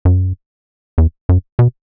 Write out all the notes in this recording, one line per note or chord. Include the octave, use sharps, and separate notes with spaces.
F#2
E2
F#2
B2